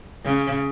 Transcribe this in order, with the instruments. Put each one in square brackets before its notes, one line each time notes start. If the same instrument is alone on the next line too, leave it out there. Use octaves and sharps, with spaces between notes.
[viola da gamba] C#3